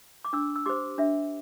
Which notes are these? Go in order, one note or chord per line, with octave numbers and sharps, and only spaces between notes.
D6
D4 E6
E6
G4 C5 D6
D4 E5